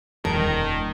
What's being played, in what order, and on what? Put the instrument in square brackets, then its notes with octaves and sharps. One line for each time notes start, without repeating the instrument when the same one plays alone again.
[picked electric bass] D#1 [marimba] F2 D3 G3 [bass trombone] D#3 [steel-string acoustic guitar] A#4